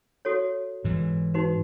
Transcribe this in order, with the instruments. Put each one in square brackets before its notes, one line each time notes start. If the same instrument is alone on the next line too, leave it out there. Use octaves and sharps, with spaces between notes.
[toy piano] F#4 A4 C#5
[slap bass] G#2 E3
[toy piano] D#4 F#4 B4